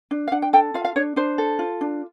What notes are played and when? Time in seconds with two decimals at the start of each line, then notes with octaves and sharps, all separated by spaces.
0.11 D4
0.28 F5
0.32 D4 F#5
0.42 G5
0.53 A4 G5
0.74 F4 F5
0.85 F5
0.96 D4 C#5
1.16 D4 C5
1.38 A4
1.59 F4
1.81 D4